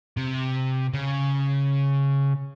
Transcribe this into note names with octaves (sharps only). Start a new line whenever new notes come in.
C3
C#3